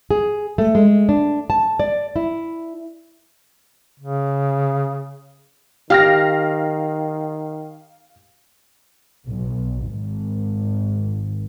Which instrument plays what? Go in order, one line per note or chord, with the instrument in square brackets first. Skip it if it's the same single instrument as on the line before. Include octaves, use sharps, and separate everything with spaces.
[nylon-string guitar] G#4
A3
G#3
D4
A5
D5
E4
[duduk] C#3
[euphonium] D#3 [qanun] G4 [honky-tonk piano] F5 F6 A#6
[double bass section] B1
G#1